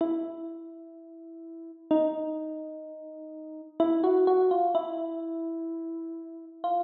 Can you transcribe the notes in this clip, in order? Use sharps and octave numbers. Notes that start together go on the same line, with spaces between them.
E4
D#4
E4
F#4
F#4
F4
E4
F4